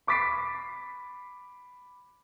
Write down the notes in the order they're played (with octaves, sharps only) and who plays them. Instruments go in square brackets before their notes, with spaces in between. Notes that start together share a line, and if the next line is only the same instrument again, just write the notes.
[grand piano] B5 D6 A6 B6 C7 D7